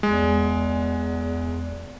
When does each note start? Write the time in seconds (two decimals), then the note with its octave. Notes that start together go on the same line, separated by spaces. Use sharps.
0.03 E2 G#3